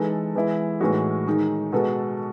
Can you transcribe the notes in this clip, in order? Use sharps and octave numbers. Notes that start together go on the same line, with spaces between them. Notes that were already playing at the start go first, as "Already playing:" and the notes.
Already playing: E3 G#3 D#4 A4
E3 G#3 B3 E4
A2 E3 G#3 D#4 F#4
D#3 G#3 D#4
B2 G#3 B3 F#4 A4